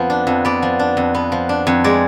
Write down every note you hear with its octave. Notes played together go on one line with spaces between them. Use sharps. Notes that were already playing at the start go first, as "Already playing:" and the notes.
Already playing: F2 F3 B3
D4
F2
B3 D5
F3
D4
F2
B3
F3
D4
F2
G#3 D5